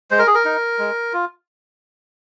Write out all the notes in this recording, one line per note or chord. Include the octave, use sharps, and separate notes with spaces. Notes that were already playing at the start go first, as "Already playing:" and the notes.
G#3 C5
A#4
G#4
A#4
D#4
G#3
F4